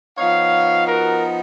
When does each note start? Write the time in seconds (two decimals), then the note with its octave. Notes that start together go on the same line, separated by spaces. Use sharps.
0.17 F3 B3 D#4 C#5 F5
0.87 F#4 A#4